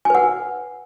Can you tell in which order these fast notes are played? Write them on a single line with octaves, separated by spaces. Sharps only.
G#5 B4 F#5